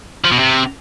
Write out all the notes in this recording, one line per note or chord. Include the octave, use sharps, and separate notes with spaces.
F3
B2
C3